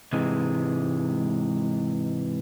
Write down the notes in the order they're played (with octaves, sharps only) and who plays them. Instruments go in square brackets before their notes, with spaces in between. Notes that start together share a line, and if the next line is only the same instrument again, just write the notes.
[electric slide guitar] G#2 C3 E3 G#3